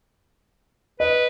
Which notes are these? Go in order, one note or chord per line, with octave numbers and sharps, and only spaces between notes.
B4 D#5